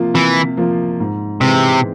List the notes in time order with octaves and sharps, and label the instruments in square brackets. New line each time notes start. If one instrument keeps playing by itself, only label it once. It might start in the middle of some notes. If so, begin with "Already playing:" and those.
Already playing: [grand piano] C3 F3 A#3 F4
[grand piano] C3 [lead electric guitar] E3
[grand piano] F3 A#3 F4
G#2
[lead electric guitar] C3 [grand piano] E3 G#3 C4